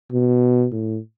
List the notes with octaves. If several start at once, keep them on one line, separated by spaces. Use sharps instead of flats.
B2
A2